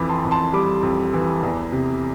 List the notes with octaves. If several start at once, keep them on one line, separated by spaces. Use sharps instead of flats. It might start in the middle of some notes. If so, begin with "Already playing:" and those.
Already playing: F2 E3 B5 D6
A5 C6
F2
A5 C6
G3 B5 D6
F2
E3
E2
C3